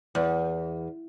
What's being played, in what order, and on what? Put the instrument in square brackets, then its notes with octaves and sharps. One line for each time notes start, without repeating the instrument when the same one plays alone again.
[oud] E2